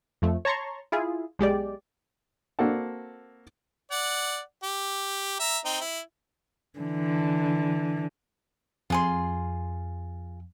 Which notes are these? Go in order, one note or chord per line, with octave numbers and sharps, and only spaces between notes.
F2 F3 A3
C#5 A5 A#5 C6 C#6
E4 F4 G#4
B1 G#3 G4 D5
A#3 C4 F#4 A4 F#5 A5
D5 F#5
G4
E5 A#5
C4 D#4
E4
D3 E3
F2 F4 G#4 C6